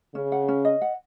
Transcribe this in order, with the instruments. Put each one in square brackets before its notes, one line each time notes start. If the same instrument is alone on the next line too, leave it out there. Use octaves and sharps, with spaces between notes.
[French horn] C#3 [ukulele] C#4
[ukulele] F#5
C#4
D#5
F#5